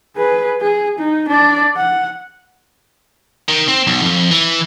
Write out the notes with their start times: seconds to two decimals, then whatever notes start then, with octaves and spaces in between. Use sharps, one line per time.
0.17 G#4 B4
0.61 G#4
0.99 D#4
1.29 D4 D5
1.77 F#5
3.49 D#3
3.68 C4
3.87 B1
4.02 F2
4.31 E3